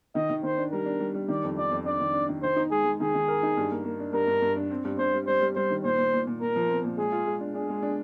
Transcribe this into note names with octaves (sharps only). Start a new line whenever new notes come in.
D#3 D#5
D#3
D#3 C5
D4
G3 A#4
D4
G3
G3
D#3 D5
F2
D#3 D5
F2
D4 D5
D#3
D4
D#3
D#3 C5
D#4
G#3 G#4
G#3
D#3 G#4
D#3
A#4
D#4
G2
A#3
A#3
D4
G2 A#4
G2
G2
D4
C4
G2
G2 C5
G3
G3 C5
G3
G3 C5
D#3
A#2 C5
A#2
A#2
A#2
A#2 A#4
F3
C4
A#2
G#3 G#4
F4
G#3
D4
D4 G#4
G#3
D4